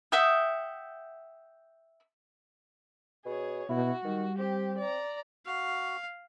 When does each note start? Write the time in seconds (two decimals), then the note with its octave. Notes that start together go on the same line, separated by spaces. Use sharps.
0.12 E5 F#5 G5 D#6
3.25 B2 G#4 C#5
3.69 B2 E4 F#4
4.04 D#3 G3
4.38 C4 G4
4.78 D5 A#5
5.46 F#4 F5